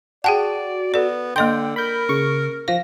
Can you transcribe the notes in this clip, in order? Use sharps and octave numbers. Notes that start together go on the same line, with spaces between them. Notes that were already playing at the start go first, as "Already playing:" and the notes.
F#4 G#4 D5 G5 A5
B3 A4 D5
D3 A#3 D#5 G5 C6
A#4 B5 G6
C#3 C#6
F3 F5 A#6